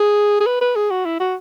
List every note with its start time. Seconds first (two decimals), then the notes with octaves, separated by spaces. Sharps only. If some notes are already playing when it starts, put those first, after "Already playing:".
Already playing: G#4
0.40 G#4
0.46 B4
0.61 B4
0.76 G#4
0.90 F#4
1.05 E4
1.20 F#4